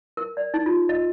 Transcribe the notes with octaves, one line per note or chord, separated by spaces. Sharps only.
A#4
D5
D#4
F4
D#5